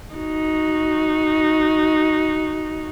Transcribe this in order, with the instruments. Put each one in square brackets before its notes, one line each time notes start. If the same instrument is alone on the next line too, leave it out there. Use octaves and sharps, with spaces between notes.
[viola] D#4 F#4